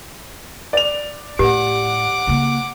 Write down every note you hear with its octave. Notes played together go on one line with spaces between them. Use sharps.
D5 F7
A2 G4 F#5 D6
C#3 A#3